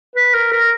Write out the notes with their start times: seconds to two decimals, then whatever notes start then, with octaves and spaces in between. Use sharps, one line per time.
0.16 B4
0.34 A#4
0.52 A#4